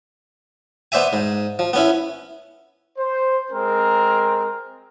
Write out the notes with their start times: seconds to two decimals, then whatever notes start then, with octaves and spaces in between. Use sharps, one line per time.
0.92 B3 C5 D5 E5 G#5
1.13 G#2
1.59 F3
1.73 B3 C#4 E4
2.98 C5
3.51 G#3 C4 A#4